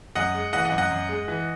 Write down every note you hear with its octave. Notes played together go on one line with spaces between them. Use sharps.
F#2 D#5 F#5
G#3
E3 D#5 F#5
D#5 F#5
F#2
D#5 F#5
F#2
G#3
E3